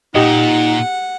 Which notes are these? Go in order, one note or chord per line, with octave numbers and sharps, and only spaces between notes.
A#2 D#4 G4 D#5 F#5